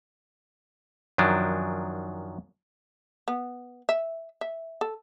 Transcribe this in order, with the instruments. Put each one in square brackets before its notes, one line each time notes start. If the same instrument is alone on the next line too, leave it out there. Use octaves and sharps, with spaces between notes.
[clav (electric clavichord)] F#2 D#3 F3 F#3 D4
[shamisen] B3
E5
E5
A4